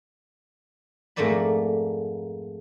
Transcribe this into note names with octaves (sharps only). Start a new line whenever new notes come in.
F2 G#2 A3 A#3 D5 B5